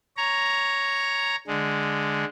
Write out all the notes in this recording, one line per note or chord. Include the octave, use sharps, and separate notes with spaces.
C#5 A#5
D3 G#3